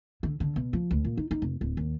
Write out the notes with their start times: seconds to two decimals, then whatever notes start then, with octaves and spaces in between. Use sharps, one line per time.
0.23 D3
0.40 D3
0.56 B2
0.73 F3
0.91 D2
1.05 A#2
1.17 D#4
1.31 D#4
1.42 F1
1.61 D1
1.77 D#2